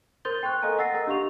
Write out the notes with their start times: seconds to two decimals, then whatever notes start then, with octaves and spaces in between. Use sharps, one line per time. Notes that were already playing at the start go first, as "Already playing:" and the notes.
0.25 A#4 C5 C6 G6 A6 G7
0.43 G5 C6 C#6 F#6
0.62 A4 A#4 D#5 F5 G#5 A#5
0.78 F#5 E6 A6 A#6 C7
0.94 A#4 D#5 A#5
1.07 D4 G4 F5 C#6 F7